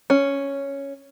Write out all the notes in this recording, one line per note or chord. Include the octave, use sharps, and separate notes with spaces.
C#4